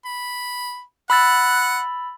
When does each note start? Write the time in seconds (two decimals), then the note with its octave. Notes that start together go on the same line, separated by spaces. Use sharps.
0.05 B5
1.10 F#5 B5 E6 A6